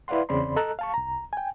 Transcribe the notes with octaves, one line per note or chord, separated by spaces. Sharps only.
E4 B4 D5 F5 F#5 C6
E2 C#3 C4 D5 B5 C6
A4 D#5 A5 A#5 E6 F#6
F5 A5 C#6
C2 A#5
G5 G#5